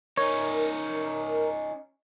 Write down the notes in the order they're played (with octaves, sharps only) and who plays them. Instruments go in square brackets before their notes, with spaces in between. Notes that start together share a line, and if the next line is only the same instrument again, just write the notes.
[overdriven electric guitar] C#4 D#4 [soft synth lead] A#4 [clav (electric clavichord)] C#5